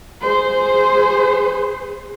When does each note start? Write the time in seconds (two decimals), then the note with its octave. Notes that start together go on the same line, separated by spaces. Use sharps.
0.22 G#4 C5